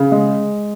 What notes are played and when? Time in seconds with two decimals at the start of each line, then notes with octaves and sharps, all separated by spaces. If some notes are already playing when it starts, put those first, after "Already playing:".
Already playing: C#3
0.12 G#3